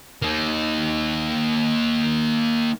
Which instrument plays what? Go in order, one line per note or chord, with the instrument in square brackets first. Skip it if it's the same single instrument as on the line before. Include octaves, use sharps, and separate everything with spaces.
[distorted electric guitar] A#3 D#4